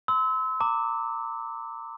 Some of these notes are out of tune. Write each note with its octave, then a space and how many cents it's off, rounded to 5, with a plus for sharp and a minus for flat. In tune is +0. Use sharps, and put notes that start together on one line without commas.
C6 -30 E6 -30
A#5 -35 D6 +0